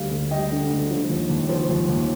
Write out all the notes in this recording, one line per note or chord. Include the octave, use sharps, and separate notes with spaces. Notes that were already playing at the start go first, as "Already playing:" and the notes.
Already playing: D2 G3 F5
D2
G3 D#5 G5
D3
D2
F3
D#2
D#2
F3
D#2
D#2